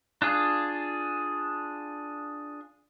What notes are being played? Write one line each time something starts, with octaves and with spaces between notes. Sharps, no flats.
D4 F4 G#4